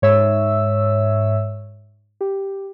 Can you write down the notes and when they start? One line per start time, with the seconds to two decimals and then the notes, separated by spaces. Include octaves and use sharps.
0.02 G#2 C#5 E5 E6
2.21 G4